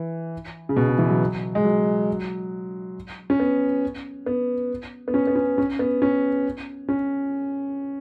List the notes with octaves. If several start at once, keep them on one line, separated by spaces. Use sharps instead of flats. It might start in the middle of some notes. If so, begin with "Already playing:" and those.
Already playing: E3
C#3
B2
C#3
E3
F#3
G#3
F#3
C#4
B3
B3
B3
C#4
B3
C#4
C#4
B3
C#4
C#4